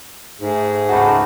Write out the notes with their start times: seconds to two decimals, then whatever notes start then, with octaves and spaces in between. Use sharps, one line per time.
0.40 G#2 A3 G#4
0.89 C#2 D#4 F#4 F#5 A5 B5